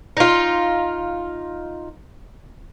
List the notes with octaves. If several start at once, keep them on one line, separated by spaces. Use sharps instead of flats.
D#4 F4